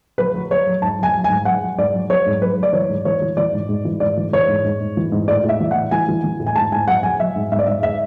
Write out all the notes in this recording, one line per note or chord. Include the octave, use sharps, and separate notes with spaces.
F#3 B4
F#3
F#3 C#5
F#3
G#2 A5
F#3 G#5
F#3
G#5
G#2
F#3 F#5
F#3
G#2 D5
F#3
F#3 C#5
G#2
F#3 B4
F#3
D5
E3 C#5
G#2
E3 C#5
E3
E3 D5
G#2
G#2
E3
G#2 D5
E3
E3 C#5
G#2
G#2
G#2
E3
G#2
A2 D5
A2
E5
E3
A2 F#5
E3 G#5
E3
E3
A2
G#5
G#2 A5
G#2 G#5
F#3 F#5
F#3 G#5
F#3 E5
G#2
G#2 E5
D5
G#2 E5
E5